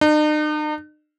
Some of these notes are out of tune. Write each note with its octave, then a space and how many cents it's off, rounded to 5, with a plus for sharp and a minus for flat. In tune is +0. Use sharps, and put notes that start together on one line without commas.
D#4 -45